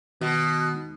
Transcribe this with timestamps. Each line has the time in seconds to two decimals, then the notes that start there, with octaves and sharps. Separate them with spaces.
0.21 B2 D#3 B3 F#4
0.74 G#3 D#4